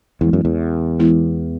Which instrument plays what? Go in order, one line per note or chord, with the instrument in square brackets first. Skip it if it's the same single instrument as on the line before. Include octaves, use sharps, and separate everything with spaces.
[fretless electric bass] E2 [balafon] E3 G#3 B3 E4
[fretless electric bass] F#2
E2
[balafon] E3 G#3 B3 E4